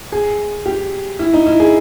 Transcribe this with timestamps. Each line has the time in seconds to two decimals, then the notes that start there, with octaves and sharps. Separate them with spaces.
0.12 G#4
0.66 G4
1.19 E4
1.34 D#4
1.46 E4
1.60 G#4